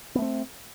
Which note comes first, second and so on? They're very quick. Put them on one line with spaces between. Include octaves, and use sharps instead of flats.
B3 A3 C4